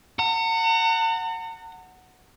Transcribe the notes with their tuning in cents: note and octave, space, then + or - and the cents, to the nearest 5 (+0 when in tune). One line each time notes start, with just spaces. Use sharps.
F#5 +0 A#5 -45